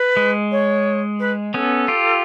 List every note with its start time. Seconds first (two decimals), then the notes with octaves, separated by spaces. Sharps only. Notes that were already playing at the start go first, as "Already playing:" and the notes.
Already playing: B4
0.17 G#3
0.51 C#5
1.19 B4
1.54 B3 C#4 A4
1.88 F4 G4